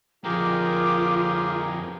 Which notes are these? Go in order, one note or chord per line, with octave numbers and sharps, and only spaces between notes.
F2 A#3 F4 G4 G#4 A#4 D6